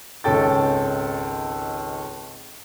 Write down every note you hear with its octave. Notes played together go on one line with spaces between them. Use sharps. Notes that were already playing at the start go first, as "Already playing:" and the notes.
G#1 C#2 C#4 A4 G5 A6